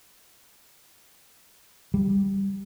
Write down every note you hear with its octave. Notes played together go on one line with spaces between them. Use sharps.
G3